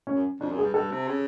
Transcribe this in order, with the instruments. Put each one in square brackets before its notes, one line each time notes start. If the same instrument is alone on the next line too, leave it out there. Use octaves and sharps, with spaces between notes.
[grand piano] C#4
[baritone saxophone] F#2
[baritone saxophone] F2 [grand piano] D4
[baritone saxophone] F#2
[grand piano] G#4
[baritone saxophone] G2
[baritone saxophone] G2 [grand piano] A4
[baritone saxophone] C3
C#3